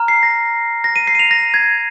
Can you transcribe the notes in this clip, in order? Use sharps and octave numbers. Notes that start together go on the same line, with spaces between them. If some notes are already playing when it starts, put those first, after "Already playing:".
Already playing: A#5 F6
C7
A#6
A#6
D#7
C7
D#7
F7
A#6
G#6